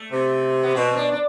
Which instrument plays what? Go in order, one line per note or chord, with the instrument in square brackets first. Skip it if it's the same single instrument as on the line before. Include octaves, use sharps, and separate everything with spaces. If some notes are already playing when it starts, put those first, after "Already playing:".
Already playing: [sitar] A3
[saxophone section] C3
[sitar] B3
[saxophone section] B2 [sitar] C4
[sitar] C4
D4
D4